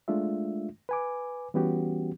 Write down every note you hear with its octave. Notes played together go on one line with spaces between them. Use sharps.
G#3 A3 D4 F4 E5
B4 G#5 D6
E3 G3 B3 C#4 F#4 G4